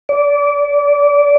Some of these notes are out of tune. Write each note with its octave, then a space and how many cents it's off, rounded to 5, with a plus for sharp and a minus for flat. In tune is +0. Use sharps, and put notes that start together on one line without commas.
D5 -25